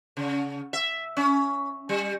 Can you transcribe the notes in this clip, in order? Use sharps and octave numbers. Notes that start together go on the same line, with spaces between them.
C#3
E5
C#4
G3